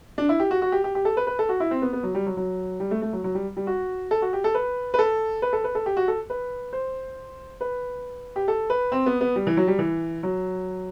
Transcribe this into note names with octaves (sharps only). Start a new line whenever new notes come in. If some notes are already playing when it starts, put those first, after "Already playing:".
D4
E4
G4
F#4
F#4
G4
G4
G4
A4
B4
B4
A4
F#4
E4
C4
B3
B3
F#3
G3
F#3
F#3
G3
A3
A3
F#3
F#3
G3
G3
F#4
A4
F#4
G4
A4
B4
B4
A4
B4
A4
B4
A4
G4
F#4
A4
B4
C5
B4
G4
A4
B4
C4
B3
B3
G3
E3
F#3
G3
E3
F#3